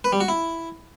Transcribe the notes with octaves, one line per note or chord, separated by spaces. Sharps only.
B4
G3
F#4
E4